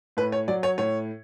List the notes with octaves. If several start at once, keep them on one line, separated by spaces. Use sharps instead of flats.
A2 B4
C#5
F#3 D5
C#5
A2 C#5